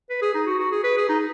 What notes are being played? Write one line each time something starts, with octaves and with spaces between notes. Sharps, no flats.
B4
G#4
D#4
F#4
F#4
G#4
B4
G#4
D#4